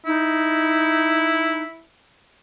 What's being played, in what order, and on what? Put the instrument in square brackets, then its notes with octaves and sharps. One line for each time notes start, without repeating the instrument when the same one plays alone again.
[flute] D#4 [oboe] E4